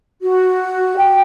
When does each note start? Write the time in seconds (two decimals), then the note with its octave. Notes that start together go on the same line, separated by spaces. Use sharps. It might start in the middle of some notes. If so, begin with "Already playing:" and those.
0.22 F#4
0.97 G5